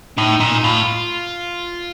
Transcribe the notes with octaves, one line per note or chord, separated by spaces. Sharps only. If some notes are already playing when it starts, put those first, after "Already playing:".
A2 D#4
A#2 D#4
A2 F4